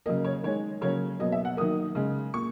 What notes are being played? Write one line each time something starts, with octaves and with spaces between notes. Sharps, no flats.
C#3 F#3 A#3 D#5
C#5
D#3 G#3 C#5
C#3 F#3 A#3 C#5
B2 F#3 A#3 D#5
E5
F#5
D#3 F#3 A#3 D#6
C#3 G#3
A#2 C#6